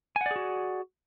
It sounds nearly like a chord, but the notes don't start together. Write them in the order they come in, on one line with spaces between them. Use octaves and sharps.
G#5 F#5 D5 G#4 F#4